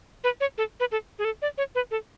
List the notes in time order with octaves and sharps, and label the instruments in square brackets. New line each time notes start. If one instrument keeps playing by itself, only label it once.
[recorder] B4
C#5
A4
B4
A4
G#4
A4
D5
C#5
B4
A4